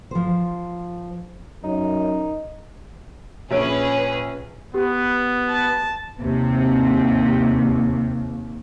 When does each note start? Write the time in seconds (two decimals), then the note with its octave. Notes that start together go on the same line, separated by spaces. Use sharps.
0.11 F3 C5
1.64 F#2 D#4
3.51 A#1 C#4 G#4 B4 C#5 D7
4.74 B3 G4
5.49 A5
6.21 D#2 C3